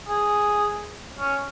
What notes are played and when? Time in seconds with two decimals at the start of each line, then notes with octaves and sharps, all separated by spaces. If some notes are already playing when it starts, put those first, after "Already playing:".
0.07 G#4
1.19 C#4